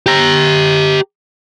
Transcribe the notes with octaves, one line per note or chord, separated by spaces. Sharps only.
G4 A#5